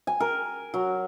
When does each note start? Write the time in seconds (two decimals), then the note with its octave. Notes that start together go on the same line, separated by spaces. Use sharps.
0.07 G#5
0.20 A#4
0.74 F#3